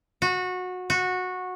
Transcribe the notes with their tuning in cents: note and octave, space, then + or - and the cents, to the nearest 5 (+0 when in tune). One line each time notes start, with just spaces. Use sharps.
F#4 -20
F#4 -15